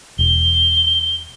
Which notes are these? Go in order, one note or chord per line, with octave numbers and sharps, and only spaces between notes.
E1 G7